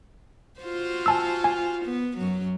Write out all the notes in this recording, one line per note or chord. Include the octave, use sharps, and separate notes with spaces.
F4 F#4 C5
G#5 A5 E6
G#5
B3
F#2 F#3